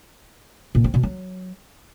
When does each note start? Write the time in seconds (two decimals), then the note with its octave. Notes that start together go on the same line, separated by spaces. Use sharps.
0.75 A#2
0.84 C4
0.94 B2
1.03 F#3